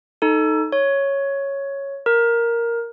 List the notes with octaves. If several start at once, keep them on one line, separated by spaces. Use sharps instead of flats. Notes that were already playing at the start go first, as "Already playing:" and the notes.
D#4 A4
C#5
A#4